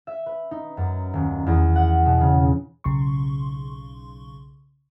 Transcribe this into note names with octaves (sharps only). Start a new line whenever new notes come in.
E5
B4
D#4
F#2
D#1
E2
F#5
B2
C#3
B1 C#3 C6 C#6